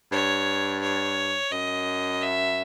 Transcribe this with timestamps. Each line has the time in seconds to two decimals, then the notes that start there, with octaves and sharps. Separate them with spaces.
0.12 G2 C#5
0.82 C#5
1.51 F#2 D#5
2.21 E5